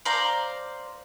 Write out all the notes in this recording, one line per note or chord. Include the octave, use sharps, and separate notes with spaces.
C5 D5 F5 A#5